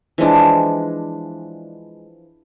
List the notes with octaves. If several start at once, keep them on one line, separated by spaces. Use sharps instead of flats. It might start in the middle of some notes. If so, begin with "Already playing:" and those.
E3 F3 G#3 D4